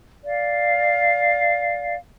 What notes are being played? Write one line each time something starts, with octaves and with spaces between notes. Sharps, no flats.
D5 F5